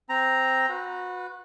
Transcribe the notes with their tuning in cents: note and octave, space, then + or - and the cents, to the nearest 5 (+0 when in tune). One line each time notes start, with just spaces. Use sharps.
C4 +0 A#5 +0
F#4 -30 B4 +0